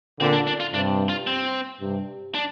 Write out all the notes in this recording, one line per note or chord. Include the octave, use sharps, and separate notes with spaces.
A#2 D3 C4
D4
D4
F4
G2 C3 D4
F4
C4
G2 C3
D4